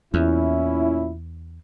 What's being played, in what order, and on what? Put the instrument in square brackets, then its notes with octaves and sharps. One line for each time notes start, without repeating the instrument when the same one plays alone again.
[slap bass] E2 [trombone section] A#2 C#4 E4